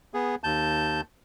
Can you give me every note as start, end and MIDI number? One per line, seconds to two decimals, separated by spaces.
0.14 0.35 59
0.14 0.35 68
0.44 1.01 39
0.44 1.01 81
0.44 1.01 91